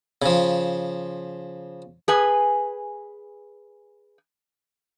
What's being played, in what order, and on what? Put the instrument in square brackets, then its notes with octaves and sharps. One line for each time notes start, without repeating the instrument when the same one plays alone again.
[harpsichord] C#3 F3
[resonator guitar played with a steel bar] G#4 B4 G#5